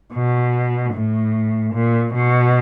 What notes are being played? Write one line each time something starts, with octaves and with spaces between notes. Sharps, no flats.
B2
A2
A#2
B2